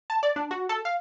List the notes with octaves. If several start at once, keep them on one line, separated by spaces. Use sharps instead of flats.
A5
D5
D4
F#4
A4
F5